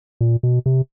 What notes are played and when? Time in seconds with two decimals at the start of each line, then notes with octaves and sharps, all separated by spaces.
0.21 A#2
0.43 B2
0.66 C3